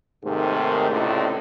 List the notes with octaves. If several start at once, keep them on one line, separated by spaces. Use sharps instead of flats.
D#2 G#2 C3 D#3 A3
C#2 A2 C3 D4